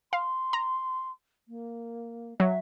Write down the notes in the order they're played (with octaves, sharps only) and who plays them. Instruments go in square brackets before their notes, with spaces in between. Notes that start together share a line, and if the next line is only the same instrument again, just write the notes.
[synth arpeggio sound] F5 [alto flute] C6
[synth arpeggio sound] A#5
[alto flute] A#3
[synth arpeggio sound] F#3 [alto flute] E5